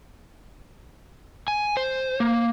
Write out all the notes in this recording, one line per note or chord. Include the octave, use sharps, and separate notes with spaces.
G#5
C5
A#3